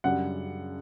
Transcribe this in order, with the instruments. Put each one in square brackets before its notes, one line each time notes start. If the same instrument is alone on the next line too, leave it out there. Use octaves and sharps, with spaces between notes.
[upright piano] F#2 C#3 G3 D4 F#5